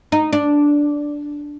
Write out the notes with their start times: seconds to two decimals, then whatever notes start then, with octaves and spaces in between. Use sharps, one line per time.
0.12 D#4
0.33 D4